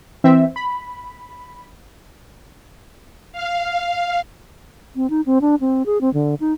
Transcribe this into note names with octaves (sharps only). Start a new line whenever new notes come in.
E3 C4 E5
B5
F5
C4
D#4
C4
D4
C4
G#4
C4
D3
D#4